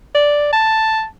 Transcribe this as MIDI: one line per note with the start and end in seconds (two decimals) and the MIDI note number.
0.15 0.51 74
0.53 1.05 81